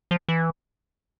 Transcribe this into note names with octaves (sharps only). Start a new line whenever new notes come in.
F3
E3